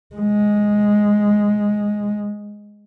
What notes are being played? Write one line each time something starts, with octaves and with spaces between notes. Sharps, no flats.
G#3